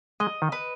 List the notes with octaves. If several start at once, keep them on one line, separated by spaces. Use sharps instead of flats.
G#3 D#5
D#3
B4